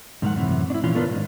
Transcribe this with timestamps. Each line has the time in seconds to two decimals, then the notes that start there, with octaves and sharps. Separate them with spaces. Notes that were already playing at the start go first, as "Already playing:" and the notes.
0.22 E2 G#2 D#3 G#3 F#5
0.34 F#2 A2 C3 E3
0.70 D4 E4
0.83 A#2 E3 C#4 F4
0.95 A3 B3 D4 F4 A#4 B4
1.08 G#2 D#3